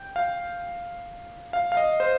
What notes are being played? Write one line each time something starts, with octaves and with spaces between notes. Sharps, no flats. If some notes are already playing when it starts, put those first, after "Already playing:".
Already playing: G5
F5
F5
F5
D#5
C5